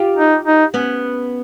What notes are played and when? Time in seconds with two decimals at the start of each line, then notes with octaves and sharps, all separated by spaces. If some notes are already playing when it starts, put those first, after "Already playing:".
Already playing: F4 G4
0.16 D#4
0.45 D#4
0.74 B3 C#4